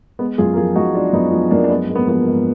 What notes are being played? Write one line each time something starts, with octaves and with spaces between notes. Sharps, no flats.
G#3 B3
F#2 F4 G#4
A#4
F3 F4 G#4
F#2 D#4 F#4
G#3 D4 F4
F#2 B3 D#4
F3
F#2 A#3 D4
D4
G#3 B3
G#2 A#3
B3
F3 B3
A#3
G#2